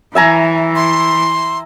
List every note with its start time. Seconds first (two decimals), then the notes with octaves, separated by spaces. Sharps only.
0.15 E3 E5 G#5 A#5
0.75 C6